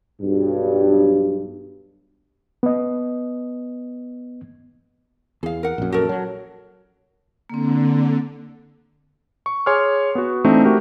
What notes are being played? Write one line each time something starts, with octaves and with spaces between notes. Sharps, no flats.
B1 G2
B3 D#5
E2 G#4 F5
A#4 F#5
A#1 F#2
F#4 A4 A#4
F#3
D3 A#3 C4
C#6
G#4 C#5 G#5 C6 D6 F6
B3 F#4
E3 A3 C4 D4 D#4
A3 F#4 G4 A#4